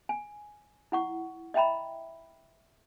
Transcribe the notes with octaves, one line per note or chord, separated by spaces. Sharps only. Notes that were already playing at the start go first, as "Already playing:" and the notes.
G#5
E4 F#5 C#6
D#5 E5 G5 A#5 B5